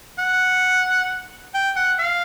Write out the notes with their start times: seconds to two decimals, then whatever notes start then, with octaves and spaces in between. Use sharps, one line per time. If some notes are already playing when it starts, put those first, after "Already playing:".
0.19 F#5
1.54 G5
1.76 F#5
2.00 F5